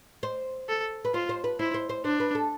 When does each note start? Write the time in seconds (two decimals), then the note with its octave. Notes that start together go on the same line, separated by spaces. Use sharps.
0.23 C5
0.69 A4
1.05 B4
1.14 F4 C5
1.29 C5
1.44 B4
1.59 E4 C5
1.74 C5
1.89 C5
2.05 D4 C5
2.20 B4
2.35 A4